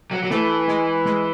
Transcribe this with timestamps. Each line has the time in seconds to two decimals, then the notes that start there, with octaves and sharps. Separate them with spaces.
0.11 F#3
0.23 F#3
0.30 E3 A3
0.68 G#3
1.06 G#3